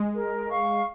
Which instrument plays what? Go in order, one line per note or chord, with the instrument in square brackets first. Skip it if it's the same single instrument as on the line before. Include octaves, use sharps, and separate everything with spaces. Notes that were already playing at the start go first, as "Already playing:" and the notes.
Already playing: [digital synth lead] G#3
[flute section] A#4
F5 C#6